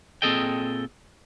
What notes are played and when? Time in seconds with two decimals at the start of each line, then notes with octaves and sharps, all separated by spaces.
0.22 A#2 C4 G#4 A4 D#5 G5